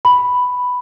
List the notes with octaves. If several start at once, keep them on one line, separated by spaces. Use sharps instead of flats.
B5